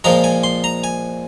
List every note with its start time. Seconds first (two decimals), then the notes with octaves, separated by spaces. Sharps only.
0.04 A#2 F3 G#3 A#5
0.24 G#5
0.44 C6
0.64 A#5
0.84 G#5